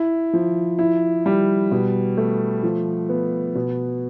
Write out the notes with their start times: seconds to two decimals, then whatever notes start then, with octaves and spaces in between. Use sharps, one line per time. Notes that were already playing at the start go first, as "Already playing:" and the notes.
Already playing: E4
0.33 F3
0.79 E4
1.26 G3
1.71 B2
2.17 A3
2.63 F3
3.09 B3
3.55 B2